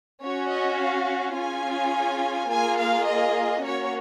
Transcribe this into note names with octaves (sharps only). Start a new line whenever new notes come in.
C#4 F#4 C#5
D#5
F5
C#4 F4 G#4 G#5
A#3 F4 G#4 G#5
F5
D#5
A#3 C#4 F#4 C#5